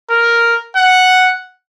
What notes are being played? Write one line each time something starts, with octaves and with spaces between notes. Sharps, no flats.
A#4
F#5